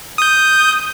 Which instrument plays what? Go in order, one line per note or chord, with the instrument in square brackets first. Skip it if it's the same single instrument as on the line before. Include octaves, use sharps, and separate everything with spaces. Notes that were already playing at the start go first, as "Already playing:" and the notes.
[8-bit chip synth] D#6 G6